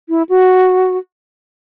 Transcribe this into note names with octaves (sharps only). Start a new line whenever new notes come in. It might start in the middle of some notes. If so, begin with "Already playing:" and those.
E4
F#4